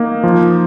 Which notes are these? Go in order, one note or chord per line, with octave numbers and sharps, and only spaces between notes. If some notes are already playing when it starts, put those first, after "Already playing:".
Already playing: A#3 D#4
F3